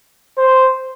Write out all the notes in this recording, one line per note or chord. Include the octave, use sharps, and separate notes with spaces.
C5